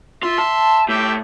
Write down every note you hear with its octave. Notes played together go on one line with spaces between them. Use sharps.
F4 E5 C6
A5
A2 G4 E5 G5